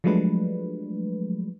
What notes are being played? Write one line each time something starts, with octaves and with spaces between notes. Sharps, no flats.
F3 F#3 G#3 A3 D4 B4